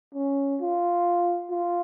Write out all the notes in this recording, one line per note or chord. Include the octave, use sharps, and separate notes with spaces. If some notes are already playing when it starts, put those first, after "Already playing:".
C#4
F4
F4